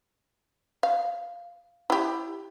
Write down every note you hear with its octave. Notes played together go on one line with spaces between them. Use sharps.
F5
E4 G4